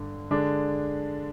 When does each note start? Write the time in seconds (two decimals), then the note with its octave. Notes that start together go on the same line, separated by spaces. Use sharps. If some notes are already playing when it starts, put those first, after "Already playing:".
Already playing: G2 D3
0.31 D3 G#3 D4